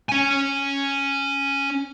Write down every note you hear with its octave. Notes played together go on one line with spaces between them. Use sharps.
C#4 G#5